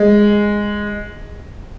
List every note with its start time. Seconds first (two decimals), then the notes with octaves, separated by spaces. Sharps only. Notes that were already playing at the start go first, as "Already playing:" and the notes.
Already playing: G#3